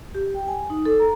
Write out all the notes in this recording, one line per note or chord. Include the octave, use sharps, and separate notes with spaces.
G4
G5
G#5
D#4
A4
A#5